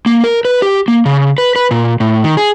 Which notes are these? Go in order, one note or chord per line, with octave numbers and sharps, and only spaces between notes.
A#3
A#4
B4
G4
A#3
C#3
B4
B4
A#2
A2
D#3
G#4